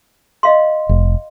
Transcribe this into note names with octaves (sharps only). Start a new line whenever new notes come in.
D#5 F5 C6
F1